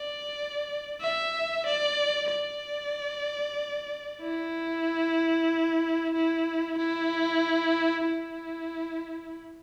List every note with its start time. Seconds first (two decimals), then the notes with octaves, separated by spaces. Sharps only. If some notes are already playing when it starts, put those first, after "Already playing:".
Already playing: D5
1.02 E5
1.66 D5
2.30 D5
4.22 E4
6.14 E4
6.78 E4
8.06 E4